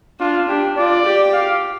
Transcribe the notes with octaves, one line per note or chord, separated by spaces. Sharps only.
D4 F4
D4 G4
F4 D5
G4
F5